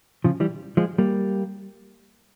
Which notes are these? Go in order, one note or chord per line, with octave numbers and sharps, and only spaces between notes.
C#3 F3
E3 G3
F3 G#3
G3 A#3